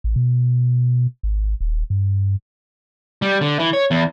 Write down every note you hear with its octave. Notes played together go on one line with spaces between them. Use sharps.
A1
B2
G#1
D#1
G2
G3
D3
E3
C#5
E2